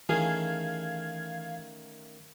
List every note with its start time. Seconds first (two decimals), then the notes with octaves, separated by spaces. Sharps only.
0.09 D#3 E3 A3 C#4 G#4 F5 G#6